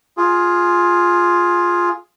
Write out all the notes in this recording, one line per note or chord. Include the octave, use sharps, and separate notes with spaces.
F4 G#4